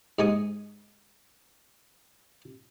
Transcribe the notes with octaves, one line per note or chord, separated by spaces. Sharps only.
G#2 G#3 G#5 C#6 D#6